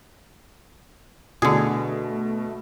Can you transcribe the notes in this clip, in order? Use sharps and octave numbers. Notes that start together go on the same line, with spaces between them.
B2 D3 A3 G#4